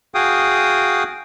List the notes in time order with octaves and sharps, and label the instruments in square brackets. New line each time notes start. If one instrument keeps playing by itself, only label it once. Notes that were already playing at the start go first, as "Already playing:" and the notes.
[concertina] F#4 G#4 F5 G5 D#6